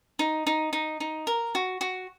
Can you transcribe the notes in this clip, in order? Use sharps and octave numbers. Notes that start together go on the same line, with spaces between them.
D#4
D#4
D#4
D#4
A#4
F#4
F#4